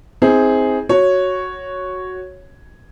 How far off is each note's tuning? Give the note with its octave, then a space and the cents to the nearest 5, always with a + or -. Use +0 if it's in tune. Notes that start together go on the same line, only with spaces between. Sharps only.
C4 +0 D#4 +45 G#4 +0
F#4 +0 C#5 +0